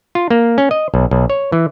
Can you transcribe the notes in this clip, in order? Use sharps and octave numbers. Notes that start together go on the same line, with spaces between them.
F4
A#3
C#4
D#5
B1
B1
C#5
E3